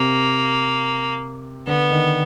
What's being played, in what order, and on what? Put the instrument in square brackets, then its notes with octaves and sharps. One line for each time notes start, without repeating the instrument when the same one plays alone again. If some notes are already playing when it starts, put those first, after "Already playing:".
Already playing: [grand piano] C3 [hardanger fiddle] A#3
[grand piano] D3 [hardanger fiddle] B3
[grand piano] D#3